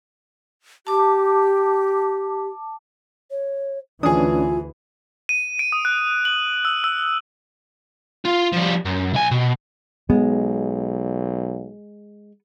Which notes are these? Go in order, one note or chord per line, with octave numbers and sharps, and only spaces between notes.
G4 A5 D6
C#5
D2 E3 C#4 D4 F4 G#4 D#6
D#7
D7
D#6
F#6
F#7
E6
E6
F4
F3 G3
F#2
B1 G#5
B2
B1 G#3 B3